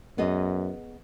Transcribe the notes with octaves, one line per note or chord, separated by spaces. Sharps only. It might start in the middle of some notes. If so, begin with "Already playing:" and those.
F#2 B3 G#4 D#5